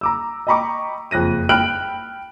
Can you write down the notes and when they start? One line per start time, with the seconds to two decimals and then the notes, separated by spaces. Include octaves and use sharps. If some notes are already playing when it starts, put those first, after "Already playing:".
0.01 A#5 D6 E6
0.47 D#5 G5 A#5 B5 C#6 D6
1.11 F#1 F2 F#6 A#6 D#7
1.49 G5 B5 F6 F#6 D7 F#7